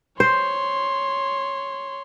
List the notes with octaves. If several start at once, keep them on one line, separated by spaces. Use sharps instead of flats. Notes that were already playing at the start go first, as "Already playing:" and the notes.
C5 C#5 C6